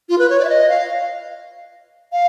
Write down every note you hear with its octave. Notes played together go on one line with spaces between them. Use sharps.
F4
B4
C#5
D5
E5
D#5
F5
F5